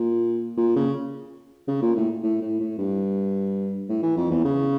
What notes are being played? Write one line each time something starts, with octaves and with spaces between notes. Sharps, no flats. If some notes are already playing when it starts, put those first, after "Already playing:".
Already playing: A#2
A#2
C#3
C#3
A#2
A2
A2
A2
A2
G2
A2
E3
F2
E2
C#3